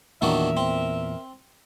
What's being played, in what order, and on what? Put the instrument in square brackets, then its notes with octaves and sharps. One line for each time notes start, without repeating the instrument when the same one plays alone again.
[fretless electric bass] E2 A#2 [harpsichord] D#3 F#3 D4 [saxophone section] A#4 E5
[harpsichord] C4